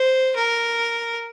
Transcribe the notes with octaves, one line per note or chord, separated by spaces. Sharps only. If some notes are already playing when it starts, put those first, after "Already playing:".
Already playing: C5
A#4